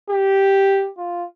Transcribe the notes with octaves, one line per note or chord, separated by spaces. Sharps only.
G4
F4